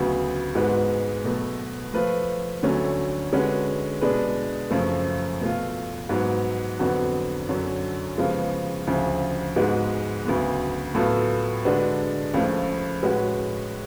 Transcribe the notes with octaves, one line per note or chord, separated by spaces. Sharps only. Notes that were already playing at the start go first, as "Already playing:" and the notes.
Already playing: D2 C#3 F#3 B3 F#4
G#2 G#3 B3 F#4 B4
B2 F#3 A3
F3 A3 F4 B4
D2 D3 F#3 A3 C#4
D3 G#3 C#4 F#4 B4
B2 G#3 D4 G#4 B4
F#2 C#3 F3 A3
B2 A3 F4
G#2 F#3 B3
F2 D3 F#3 B3 F#4
F#2 D3 F#3 C#4
C#3 F3 G#3 B3 F4
D2 C#3 F3
G#2 G#3 B3 F#4 B4
D2 C#3 F#3 B3
A2 F#3 B3 F4 A4
D3 G#3 D4 F#4 B4
C#2 C#3 F3 A3
A2 G#3 C#4 F#4 B4